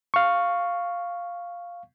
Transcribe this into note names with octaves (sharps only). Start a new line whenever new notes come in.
F5 C#6